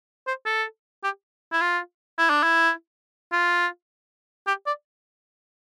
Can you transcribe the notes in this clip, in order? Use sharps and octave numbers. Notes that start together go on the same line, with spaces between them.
C5
A4
G4
E4
F4
E4
D4
E4
F4
G4
D5